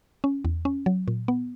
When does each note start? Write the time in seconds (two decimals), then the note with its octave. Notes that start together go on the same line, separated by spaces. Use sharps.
0.24 C#4
0.45 E2
0.65 C#4
0.86 F#3
1.08 A#2
1.28 B3